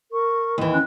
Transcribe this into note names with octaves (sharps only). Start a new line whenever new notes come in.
A#4 C#6
D#2 E3
C#4 G#5 F#6